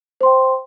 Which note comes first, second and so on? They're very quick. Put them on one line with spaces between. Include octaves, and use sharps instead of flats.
C5 C6 G5